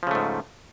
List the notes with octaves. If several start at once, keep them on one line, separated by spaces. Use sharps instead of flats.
G#2 C#3 F3 A3